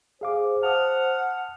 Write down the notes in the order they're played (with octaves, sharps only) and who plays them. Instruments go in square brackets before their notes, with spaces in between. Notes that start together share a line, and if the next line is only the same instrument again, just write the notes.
[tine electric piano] G#4 F5 D6 [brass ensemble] C5
[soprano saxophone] F#5 [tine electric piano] A5 D#6 [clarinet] F6